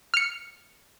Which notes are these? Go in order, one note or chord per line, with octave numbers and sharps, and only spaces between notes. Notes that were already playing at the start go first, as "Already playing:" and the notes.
F6 C#7